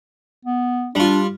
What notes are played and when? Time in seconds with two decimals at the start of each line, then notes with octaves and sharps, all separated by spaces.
0.45 B3
0.95 G3 D4 F4